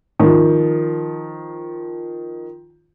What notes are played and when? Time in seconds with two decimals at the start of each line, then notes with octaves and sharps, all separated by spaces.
0.19 D#3 F3